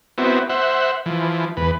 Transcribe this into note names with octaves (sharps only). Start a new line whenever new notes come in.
B3 C4 E4 F#4
C5 E5 F#5
E3 F3
E2 B4